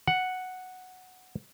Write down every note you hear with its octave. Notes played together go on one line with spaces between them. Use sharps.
F#5